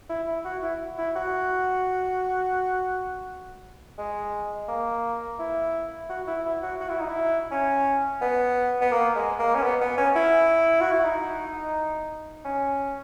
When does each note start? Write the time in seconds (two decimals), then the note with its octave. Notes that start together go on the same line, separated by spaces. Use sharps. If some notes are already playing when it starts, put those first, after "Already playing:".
0.09 E4
0.27 E4
0.45 F#4
0.62 E4
0.98 E4
1.16 F#4
3.98 G#3
4.68 A#3
5.39 E4
6.09 F#4
6.27 E4
6.45 E4
6.62 F#4
6.80 F#4
6.89 E4
6.99 D#4
7.09 E4
7.51 C#4
8.21 B3
8.81 B3
8.92 A#3
9.16 G#3
9.39 A#3
9.55 C#4
9.62 B3
9.81 B3
9.97 C#4
10.16 E4
10.81 F#4
10.92 E4
11.04 D#4
12.45 C#4